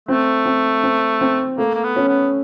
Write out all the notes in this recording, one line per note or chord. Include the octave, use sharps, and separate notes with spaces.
A3 C4
C4
C4
C4
A3 A#3
A#3
B3
C#4
B3